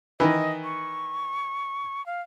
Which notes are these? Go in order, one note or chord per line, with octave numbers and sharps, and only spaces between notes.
D#3 E3 D#5
C#6
F5